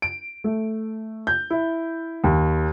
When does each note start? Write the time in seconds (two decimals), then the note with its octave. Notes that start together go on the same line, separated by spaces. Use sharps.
0.02 D7
0.44 A3
1.27 G6
1.50 E4
2.24 D#2